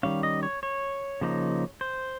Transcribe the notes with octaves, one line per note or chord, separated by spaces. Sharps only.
D#3 G3 C#4 F5
D#5
C#5
C#5
C#3 F3 A#3 D#4
C5